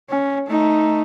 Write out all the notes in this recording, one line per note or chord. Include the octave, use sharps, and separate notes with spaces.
C#4
A3 D#4